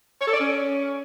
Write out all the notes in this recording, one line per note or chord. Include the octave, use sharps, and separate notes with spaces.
C#5
A4
D5
C#4